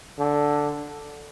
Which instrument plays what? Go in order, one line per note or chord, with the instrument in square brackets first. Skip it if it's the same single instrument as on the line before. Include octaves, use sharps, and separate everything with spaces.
[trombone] D3